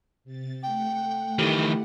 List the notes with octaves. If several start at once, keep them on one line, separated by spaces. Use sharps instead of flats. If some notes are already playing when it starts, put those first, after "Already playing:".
C3 A6
A3 F#5 G5
D#3 E3 E4 G4 A4